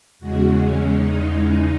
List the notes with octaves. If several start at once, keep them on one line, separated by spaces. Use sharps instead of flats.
E2 C#3 G#3 F#4
C#4
D#4